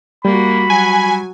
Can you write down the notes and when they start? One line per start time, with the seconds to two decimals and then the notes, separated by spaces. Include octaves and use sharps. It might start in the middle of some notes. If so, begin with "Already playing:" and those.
0.25 G3 A#3 F#4 B5
0.70 F#3 G#5